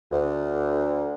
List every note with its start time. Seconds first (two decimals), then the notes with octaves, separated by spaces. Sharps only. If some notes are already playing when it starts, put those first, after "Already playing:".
0.12 D2